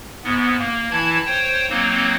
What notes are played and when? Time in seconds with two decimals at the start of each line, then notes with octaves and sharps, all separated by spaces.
0.24 G#2 B3
0.59 A#3
0.91 E3 E4 A5 G#6
1.25 C5 C#5 G5
1.69 F#3 A#3 C4 D#4